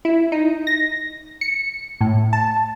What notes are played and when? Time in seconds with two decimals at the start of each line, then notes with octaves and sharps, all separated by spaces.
0.05 E4
0.32 D#4
0.67 A#6
1.41 C#7
2.01 A2
2.33 A5